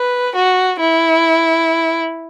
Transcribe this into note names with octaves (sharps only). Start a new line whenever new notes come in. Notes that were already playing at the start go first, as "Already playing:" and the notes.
Already playing: B4
F#4
E4